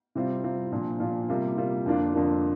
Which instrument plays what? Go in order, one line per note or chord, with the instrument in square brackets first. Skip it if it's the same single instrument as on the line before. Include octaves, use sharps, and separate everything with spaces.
[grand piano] C3 G3 C4 F4
C3 G3 C4 F4
A#2 F3 D4 F4
A#2 F3 D4 F4
C3 G3 A#3 F4
C3 G3 A#3 F4
F2 D3 A#3 D4 F4
F2 D3 A#3 D4 F4